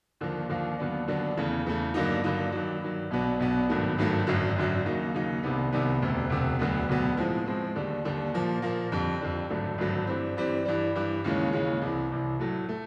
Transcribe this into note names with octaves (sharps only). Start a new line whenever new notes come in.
D#2 D3 F3 A#3
D#2 D3 F3 A#3
D#2 D3 F#3 B3 D4
D#2 D3 F#3 B3 D4
E2 C#3 E3 A3
E2 C#3 E3 A3
G2 D3 F#3 A#3 D#4
G2 D3 F#3 A#3 D#4
G2 D#3 F#3
G2 D#3 F#3
B1 B2 F#3 B3 D4
B1 B2 F#3 B3 D4
G#1 G2 D#3 F#3 A3
G#1 G2 D#3 F#3 A3
G#1 F#2 D3 F#3
G#1 F#2 D3 F#3
D#2 C#3 F#3 A#3 D#4
D#2 C#3 F#3 A#3 D#4
C2 C3 D#3 G3 B3
C2 C3 D#3 G3 B3
E1 D2 C3
E1 D2 C3
E1 D2 D3 F#3 B3
E1 D2 D3 F#3 B3
A2 F3 G#3 C4
A2 F3 G#3 C4
D#2 D3 G3
D#2 D3 G3
A#2 F3 A#3
A#2 F3 A#3
F2 D3 G3
F2 D3 G3
G#1 G2 D3 F#3 A3
G#1 G2 D3 F#3 A3
G2 E3 G3 C4
G2 E3 G3 C4
G2 E3 G3
G2 E3 G3
D#2 C#3 E3 G#3 C#4
D#2 C#3 E3 G#3 C#4
C2 C3 E3
C2 C3 E3
A2 F#3 A3
A3